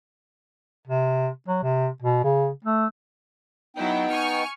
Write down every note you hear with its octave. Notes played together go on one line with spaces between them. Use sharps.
C3
F#3
C3
B2
C#3
A3
F#3 B3 D#4 E4 G5
G#5 C#6 F6